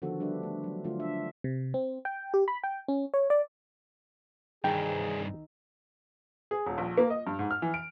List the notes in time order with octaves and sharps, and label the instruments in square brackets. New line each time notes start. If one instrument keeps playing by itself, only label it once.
[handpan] D3 D#3 F3 B3 F#4 A4
G3 D4 G4 B4 E5
A3
F#3
D3 A3 D4 F4
E5
[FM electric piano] C3
C4
G5
G4
B5
G5
C#4
C#5
D5
[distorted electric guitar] C2 G2 [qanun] D#3 D#4 E5 [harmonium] G#4 [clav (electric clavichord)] G5
[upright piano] G#4
D#1
A#1
A#3
D#5
G2
G#2
F6
E3
D7